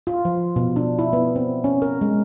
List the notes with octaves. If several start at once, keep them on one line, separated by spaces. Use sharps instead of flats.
F4
F3
B2
D4
E4
B3
C4
C#4
A#4
G#3